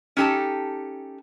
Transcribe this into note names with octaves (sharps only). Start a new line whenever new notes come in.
C#4 D#4 G4 A4 A5